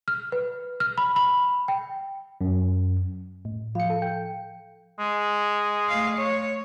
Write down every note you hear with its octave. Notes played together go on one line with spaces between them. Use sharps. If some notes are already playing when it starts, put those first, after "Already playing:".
F6
B4
F6
B5
B5
G5
F#2
A2
F3 F5 C#7
A4
G5
G#3
A3 F5
C#5